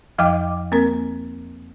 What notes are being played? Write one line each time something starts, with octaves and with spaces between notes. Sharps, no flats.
F2 F3 D#5 F5 G5 D6
A#3 C4 A#4